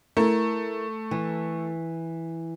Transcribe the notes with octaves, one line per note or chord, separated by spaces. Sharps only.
A3 E4 A#4
E3